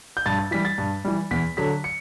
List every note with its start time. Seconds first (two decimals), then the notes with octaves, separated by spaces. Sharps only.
0.17 G6
0.26 G2 A6
0.39 A6
0.51 E3 G3 B6
0.65 A6
0.78 G2
1.05 E3 G3
1.31 E2 B6
1.57 D3 F#3 B6
1.84 C#7